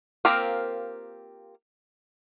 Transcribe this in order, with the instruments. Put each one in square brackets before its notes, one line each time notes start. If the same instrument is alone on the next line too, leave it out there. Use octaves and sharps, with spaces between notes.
[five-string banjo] A#3 C4 F4 G4 A#4